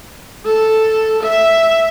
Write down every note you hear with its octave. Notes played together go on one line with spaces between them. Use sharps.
A4
E5